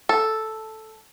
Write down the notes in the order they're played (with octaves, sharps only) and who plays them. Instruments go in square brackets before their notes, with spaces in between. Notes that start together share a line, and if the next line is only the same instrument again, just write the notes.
[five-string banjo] A4